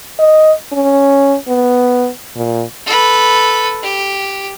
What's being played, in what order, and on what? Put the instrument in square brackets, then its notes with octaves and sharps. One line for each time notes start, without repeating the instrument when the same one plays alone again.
[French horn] D#5
C#4
B3
A#2
[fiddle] A4 B4
G4